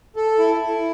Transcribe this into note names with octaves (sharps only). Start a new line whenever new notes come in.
A4
E4
E4